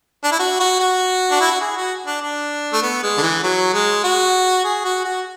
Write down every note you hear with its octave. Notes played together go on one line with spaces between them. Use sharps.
D4
E4
F#4
F#4
F#4
D4
E4
F#4
G#4
F#4
D4
D4
A3
B3
G#3
D3
E3
F#3
G#3
F#4
G#4
F#4
F#4